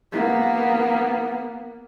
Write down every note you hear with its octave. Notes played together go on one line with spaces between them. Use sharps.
A#3 B3